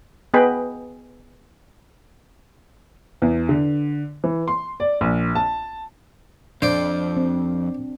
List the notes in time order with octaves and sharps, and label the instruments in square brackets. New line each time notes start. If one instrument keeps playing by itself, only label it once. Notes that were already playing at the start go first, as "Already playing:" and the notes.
[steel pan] B3 G#4 B4 D#5 G5 B5
[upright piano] E2
D3
E3
C6
D5
A#1
A5
[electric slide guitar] F2 [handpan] D4 [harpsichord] C5 D5
[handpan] C4